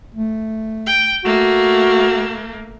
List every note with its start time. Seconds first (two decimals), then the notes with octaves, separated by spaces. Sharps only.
0.14 A3
0.86 G5
1.24 A3 A#3 F#4